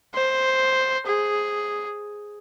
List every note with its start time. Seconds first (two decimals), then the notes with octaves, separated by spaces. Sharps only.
0.15 C5
1.07 G#4